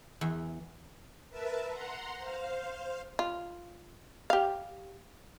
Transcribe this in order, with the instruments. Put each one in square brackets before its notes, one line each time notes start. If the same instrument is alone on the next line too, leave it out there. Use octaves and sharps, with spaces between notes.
[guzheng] E2
[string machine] A#4 B4 E5 A5
F#5 A#5 C6
C5 F5
[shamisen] F4
G4 F5